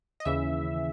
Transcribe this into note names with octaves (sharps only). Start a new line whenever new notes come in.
D#5
D#2 C#3 E3 E5